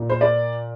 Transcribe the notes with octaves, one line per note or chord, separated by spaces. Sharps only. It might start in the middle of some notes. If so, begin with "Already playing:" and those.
Already playing: A#2
C5
D5